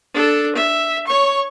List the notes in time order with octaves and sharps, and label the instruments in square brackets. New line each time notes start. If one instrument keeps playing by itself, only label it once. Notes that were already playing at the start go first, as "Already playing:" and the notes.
[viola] D4 A4
E5
C#5 C#6